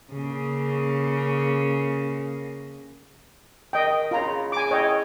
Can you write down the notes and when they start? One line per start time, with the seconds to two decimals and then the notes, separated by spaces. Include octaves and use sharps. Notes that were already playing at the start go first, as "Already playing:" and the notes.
0.13 C#3 A#3
3.73 D#3 D#5 G5
4.11 C#3 F4 A#5 B5
4.52 G#5 D6
4.71 E4 C#5 D#5 G5